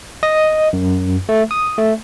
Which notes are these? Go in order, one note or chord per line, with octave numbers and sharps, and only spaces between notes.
D#5
F#2
A3
D#6
A3